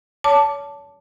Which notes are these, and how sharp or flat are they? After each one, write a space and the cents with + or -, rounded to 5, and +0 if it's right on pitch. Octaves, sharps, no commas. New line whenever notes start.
C#5 +35 A5 +0 D6 +0